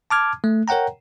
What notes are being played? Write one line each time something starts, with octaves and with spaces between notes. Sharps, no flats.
A5 D6 F6 G#6
A3
A#4 C#5 F#5 G5 A#5